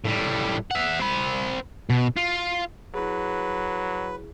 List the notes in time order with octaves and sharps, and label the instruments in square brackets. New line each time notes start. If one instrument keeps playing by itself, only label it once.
[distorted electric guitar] A2 G3
E5 F#5
C4 B5
B2
F4
[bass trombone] F#3 [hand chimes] E4 G#4 [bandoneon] B4